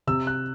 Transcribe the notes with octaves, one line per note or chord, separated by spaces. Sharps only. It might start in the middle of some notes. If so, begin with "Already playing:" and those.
C3 E6
F#6